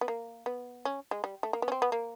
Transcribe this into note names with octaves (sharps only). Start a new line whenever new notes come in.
B3
A#3
B3
C#4
G#3
G3
A3
A#3
B3
C#4
C4
B3
A#3